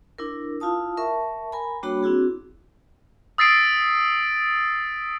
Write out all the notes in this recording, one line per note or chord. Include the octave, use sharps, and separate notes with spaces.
D4 E4 A#4
E4 F4 F5 A5 D#6
A#4 E5 A5 C#6
A#4 G#5 A#5 B5
G3 A#3 D4 F#4 C#5 B5
C4 D4 E4 F#4 G#4
D#6 E6 A6 B6 C7 D7